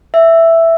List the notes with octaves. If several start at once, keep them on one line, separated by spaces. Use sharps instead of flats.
E5